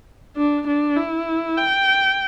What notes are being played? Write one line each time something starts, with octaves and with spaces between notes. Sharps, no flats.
D4
D4
E4
G5